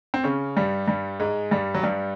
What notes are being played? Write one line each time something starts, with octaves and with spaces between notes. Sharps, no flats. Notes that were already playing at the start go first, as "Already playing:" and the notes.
C4
C#3 C#4
G2 G3
G2 G3
G#2 G#3
G2 G3
F#3
G2 G3